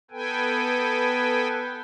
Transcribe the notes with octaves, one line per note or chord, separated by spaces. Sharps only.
B3 A4 B4 G5 G#5